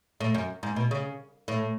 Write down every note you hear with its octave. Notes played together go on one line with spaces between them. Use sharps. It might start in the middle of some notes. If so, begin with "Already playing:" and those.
A2
F#2
G#2
B2
C#3
A2